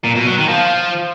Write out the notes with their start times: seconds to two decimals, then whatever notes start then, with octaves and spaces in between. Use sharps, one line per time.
0.04 A#2
0.15 B2
0.26 F#3
0.38 D#3
0.49 F3